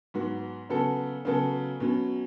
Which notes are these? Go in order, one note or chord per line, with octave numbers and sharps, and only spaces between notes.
G#2 F#3 B3 F#4
C#3 F#3 B3 F#4 A4
C#3 F#3 B3 F#4 A4
B2 F#3 C#4